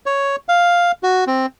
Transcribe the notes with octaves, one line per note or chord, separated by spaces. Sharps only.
C#5
F5
F#4
C4